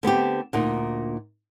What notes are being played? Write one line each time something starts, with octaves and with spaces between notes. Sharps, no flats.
D3 B3 C4 G4
D2 A#2 D#4